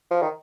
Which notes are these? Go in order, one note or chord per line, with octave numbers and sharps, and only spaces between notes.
F3
D#3